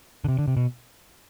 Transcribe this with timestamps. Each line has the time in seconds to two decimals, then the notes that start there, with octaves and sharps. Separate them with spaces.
0.24 D3
0.28 C3
0.39 D3
0.48 C3
0.57 B2